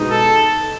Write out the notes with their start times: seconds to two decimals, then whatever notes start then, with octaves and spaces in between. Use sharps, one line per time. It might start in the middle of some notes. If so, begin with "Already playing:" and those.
Already playing: B2 G#3 D#4
0.11 A4